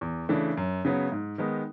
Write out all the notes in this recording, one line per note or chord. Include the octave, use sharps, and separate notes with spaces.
E2
C#3 E3 A3 D4
F#2
C#3 F#3 B3
G#2
D#3 G#3 B3 D#4